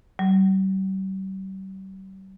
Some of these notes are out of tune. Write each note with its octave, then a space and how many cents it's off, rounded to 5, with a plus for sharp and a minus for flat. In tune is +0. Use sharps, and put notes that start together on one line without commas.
G3 -40